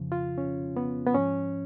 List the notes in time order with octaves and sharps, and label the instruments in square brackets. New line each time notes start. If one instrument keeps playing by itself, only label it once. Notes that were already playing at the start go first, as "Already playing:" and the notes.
Already playing: [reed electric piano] F2 C#3 F3
F4
C#4
B3
B3
G#2 F3 C#4